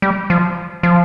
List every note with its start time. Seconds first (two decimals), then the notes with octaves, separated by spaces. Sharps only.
0.02 G3
0.30 F3
0.83 F3